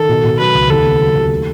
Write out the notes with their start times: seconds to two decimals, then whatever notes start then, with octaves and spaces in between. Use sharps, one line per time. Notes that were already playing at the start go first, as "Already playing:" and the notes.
Already playing: D#3 A4
0.09 B2
0.24 B2
0.39 F#3 B4
0.55 C#2
0.70 D#2 A4
0.85 B3
1.00 F#3
1.16 D#2
1.30 A3